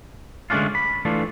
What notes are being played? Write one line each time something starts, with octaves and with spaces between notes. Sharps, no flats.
D3 G#3 A3 C#4 D4 F4
B5
E3 A3 D4 F4